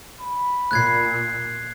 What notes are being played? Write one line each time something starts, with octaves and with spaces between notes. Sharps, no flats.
B5
A#2 F#6 G#6 C7